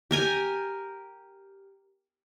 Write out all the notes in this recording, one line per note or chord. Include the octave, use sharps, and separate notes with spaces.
G4 A#4 G#5